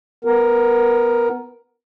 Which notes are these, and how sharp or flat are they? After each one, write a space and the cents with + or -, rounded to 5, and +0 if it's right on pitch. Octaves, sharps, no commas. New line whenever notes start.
B3 +0 A#4 +5